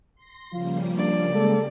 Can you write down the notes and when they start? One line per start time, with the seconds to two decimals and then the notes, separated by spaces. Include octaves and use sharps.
0.15 C6 A#6
0.53 C#3 F3 G3 A#3 F4
0.97 D4 D5
1.34 G#3 A4